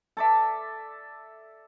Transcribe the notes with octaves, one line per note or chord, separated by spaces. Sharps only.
A4 D5 E5